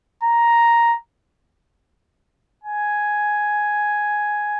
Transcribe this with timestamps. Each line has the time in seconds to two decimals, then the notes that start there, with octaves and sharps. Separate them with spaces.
0.24 A#5
2.64 G#5